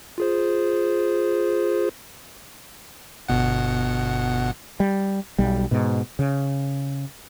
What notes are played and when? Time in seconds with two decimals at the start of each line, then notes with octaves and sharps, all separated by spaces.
0.18 F4 G#4 C5
3.29 G1 B2 F#5
4.80 G3
5.38 B1 G3
5.71 G#2 B2
6.19 C#3